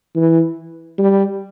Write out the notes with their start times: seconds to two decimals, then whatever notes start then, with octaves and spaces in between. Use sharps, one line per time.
0.15 E3
0.98 G3